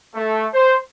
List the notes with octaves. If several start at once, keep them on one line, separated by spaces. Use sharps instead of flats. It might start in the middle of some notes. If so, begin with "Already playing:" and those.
A3
C5